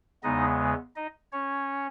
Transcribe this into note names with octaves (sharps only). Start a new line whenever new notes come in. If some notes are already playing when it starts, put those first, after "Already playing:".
E2 C#3 G#3 B3 D#4 D#5
D#4 D#5
C#4 C#5